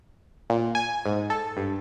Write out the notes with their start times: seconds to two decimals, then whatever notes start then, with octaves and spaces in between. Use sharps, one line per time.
0.50 A#2
0.75 G#5
1.06 G#2
1.30 A4
1.57 G2